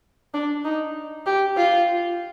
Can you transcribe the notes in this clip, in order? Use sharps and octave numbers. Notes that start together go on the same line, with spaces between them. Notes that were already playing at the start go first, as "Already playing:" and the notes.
D4
D#4
G4
F4